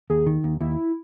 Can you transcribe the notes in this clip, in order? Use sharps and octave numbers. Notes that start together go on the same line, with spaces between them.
D#2 G#4
D#3
D#2
D#2 E4